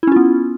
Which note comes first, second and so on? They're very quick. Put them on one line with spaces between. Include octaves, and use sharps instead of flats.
E4 C#4 F4 B3